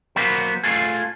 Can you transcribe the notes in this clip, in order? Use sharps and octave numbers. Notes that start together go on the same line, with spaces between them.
F#3 A#3 B3 F#4 B4 C5
A3 F4 G#4